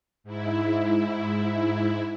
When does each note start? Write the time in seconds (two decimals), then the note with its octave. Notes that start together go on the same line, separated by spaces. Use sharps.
0.24 G#2 E4